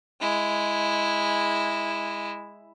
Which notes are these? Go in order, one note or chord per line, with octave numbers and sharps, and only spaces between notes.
G#3 E4